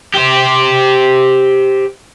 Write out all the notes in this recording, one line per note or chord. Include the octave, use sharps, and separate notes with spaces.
G4 C5